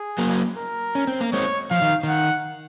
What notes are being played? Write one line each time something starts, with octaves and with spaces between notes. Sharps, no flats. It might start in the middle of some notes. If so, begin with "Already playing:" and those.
Already playing: G#4
F#3 A#3
A#4
C#4
C4
A#3
G#3 C4 C#5
F3 F5
D#3
D#3
F#5